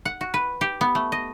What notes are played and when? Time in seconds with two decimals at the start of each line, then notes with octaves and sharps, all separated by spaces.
0.05 F#5
0.21 F#4
0.34 B4
0.61 G4
0.81 B3
0.95 A3
1.12 D#5